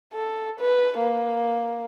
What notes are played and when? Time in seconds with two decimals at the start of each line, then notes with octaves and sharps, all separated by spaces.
0.13 A4
0.60 B4
0.99 A#3